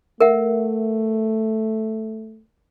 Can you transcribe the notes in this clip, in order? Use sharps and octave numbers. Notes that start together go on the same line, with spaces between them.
A3 A#4 E5 F#5